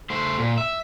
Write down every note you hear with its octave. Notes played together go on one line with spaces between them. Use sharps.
A3 C5
A#2
E5